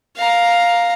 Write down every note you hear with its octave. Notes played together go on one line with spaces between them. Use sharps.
F5 A#5